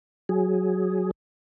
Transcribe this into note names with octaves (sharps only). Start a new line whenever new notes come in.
F#3 G#4